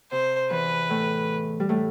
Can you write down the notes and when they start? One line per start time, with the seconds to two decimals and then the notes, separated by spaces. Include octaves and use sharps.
0.11 C3 C5
0.50 E2 E3 B4
0.90 A2 A3
1.60 G3
1.69 A2 A3